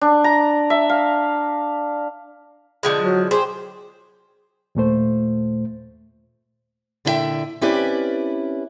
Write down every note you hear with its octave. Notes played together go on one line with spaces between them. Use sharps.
D4
A#5
E5
F5
D3 F3 G#3
F#3
G4 G#4 C5
D#2 A#2 A3 C5
A#2 D3 E4 A4 E5 G5
C4 C#4 E4 G4 B4 D5